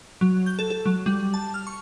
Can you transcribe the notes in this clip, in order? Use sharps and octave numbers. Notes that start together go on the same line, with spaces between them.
F#3
G6
A4
A4
F#3
G3
A5
F6
C#6